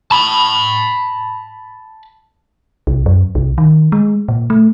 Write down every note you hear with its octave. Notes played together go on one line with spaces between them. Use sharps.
A5 B5
C2
F#2
C2
D#3
G#3
A#2
A3